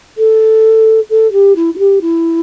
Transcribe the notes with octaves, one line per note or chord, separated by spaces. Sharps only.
A4
A4
G4
E4
E4
G4
E4